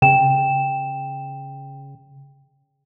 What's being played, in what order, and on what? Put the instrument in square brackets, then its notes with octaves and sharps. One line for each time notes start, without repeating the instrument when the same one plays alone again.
[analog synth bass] C#3 [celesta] G5 E7